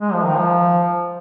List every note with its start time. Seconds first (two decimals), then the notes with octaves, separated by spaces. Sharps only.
0.01 G#3
0.13 F3
0.25 D#3
0.37 F3